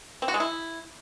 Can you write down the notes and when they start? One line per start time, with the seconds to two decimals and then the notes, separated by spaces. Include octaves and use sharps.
0.22 C4
0.28 F#4
0.34 G#3
0.40 E4